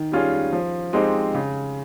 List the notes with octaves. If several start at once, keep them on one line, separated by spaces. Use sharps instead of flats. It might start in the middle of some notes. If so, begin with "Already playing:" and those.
Already playing: D#3
G3 C#4 F4 G#4
F3
G#3 C4 D#4 G4
C#3